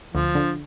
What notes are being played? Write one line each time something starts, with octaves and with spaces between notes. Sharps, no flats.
D2 F3
D3